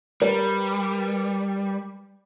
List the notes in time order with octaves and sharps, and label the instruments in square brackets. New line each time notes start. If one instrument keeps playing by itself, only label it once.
[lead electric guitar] G3 [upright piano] A#4 B4